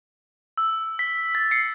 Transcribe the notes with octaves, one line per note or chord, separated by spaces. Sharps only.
E6
B6
A6
C7 C#7